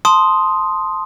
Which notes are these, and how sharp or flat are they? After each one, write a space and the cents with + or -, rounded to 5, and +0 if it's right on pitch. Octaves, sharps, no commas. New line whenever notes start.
A5 +0 C6 +0 D#6 +0